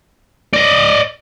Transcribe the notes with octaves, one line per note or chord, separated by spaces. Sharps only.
D5 D#5